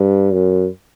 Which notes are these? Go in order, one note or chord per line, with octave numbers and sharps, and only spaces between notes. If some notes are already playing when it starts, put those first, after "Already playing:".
Already playing: G2
F#2